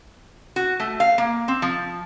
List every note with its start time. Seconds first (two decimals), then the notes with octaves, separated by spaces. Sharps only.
0.56 F#4
0.80 A3
1.00 F5
1.18 A#3
1.48 C4
1.62 F3